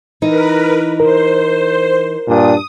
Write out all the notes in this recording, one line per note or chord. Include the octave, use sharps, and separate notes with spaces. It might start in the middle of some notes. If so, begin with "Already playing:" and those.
E3 D#4 A#4 B4
A#4 C5
G2 A#2 D4 D#6